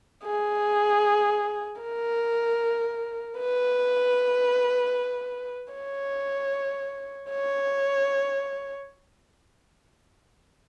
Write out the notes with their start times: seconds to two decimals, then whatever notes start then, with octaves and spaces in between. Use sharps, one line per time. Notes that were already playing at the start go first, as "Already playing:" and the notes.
0.24 G#4
1.82 A#4
3.38 B4
5.74 C#5
7.30 C#5